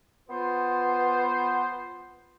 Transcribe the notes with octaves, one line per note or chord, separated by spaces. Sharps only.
B3 F4 C5